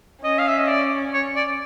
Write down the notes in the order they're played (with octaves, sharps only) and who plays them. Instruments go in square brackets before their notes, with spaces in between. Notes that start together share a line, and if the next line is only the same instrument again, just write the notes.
[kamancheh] C#4 [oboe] D#5
[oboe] F5
E5
D#5
D5
C#5
D5